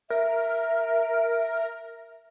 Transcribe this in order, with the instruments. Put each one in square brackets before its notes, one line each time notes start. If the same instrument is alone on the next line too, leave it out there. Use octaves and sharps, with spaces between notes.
[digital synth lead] A#4 [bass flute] E5